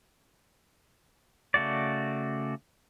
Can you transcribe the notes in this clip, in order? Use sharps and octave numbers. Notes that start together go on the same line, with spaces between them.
C#3 A3 F#4 D5